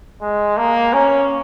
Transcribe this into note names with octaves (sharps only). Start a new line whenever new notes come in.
G#3
A#3
C#4